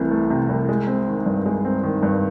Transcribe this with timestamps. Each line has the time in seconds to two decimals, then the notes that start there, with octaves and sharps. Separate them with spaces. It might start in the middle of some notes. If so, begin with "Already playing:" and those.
Already playing: C2 C3 E3 A3
0.11 A3
0.30 C3
0.49 C2
0.69 G#3
0.87 C4
1.08 D#3
1.26 G2
1.46 G#3
1.65 C4
1.83 D#3
2.03 G2